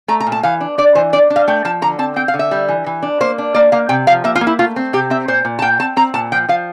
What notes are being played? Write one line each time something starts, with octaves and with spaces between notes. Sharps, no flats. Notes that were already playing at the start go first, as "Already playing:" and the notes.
A3 A#5
A#5
A#2
A5
E3 F5
D4
D4 D5
E3 C5
D4 D5
D4
F5
A3 G5
F3 A5
D3 A#5
C4 A5
C4 G5
F5
D3
E5
G3
E3
E3
D4
A#3 C5
D4
A#3 D5
A#3 F5
C3 G5
F3 F5
A#3 E5
F4
A#3
E4
A3 F4
C4
C3 G4
C4 E5
A#2 C5
A#2
A5
A#2 G5
C4 A5
C4 A#5
A#2 A5
F3 G5
F3 F5